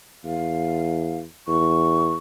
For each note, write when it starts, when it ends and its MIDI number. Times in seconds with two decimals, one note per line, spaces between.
0.24 1.24 40
0.24 1.18 77
1.48 2.17 40
1.48 2.15 85